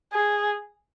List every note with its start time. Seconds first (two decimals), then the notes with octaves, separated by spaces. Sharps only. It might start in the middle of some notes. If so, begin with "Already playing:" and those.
0.13 G#4